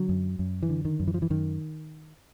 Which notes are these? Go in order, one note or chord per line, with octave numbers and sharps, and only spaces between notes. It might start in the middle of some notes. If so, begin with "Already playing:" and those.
Already playing: D3 F#3
F#2
F#2
E3
D3
D#3
F#2
E3
F3
E3
F#2 D#3